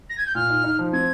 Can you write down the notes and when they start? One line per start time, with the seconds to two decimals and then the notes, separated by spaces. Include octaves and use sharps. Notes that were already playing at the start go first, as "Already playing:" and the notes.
0.10 A#6
0.17 G#6
0.26 G6
0.35 A#2 F6
0.50 D#4
0.64 D#4
0.79 F3
0.93 C4 G#6